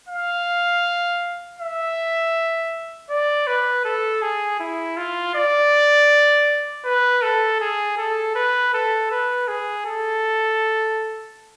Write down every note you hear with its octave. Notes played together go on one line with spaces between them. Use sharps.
F5
E5
D5
B4
A4
G#4
E4
F4
D5
B4
A4
G#4
A4
B4
A4
B4
G#4
A4